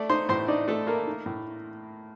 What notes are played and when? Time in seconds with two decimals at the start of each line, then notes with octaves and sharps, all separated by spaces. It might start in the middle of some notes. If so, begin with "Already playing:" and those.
Already playing: A3 D5
0.09 D#4 C5 C6
0.29 A2 C5 C6
0.48 D4 D#4 D5
0.68 A3 A4
0.87 A3 A#3 A#4
1.07 D#4
1.26 A2